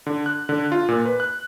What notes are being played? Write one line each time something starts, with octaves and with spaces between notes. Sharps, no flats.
D3
F#6
D3
F4
A#2
B4
F#6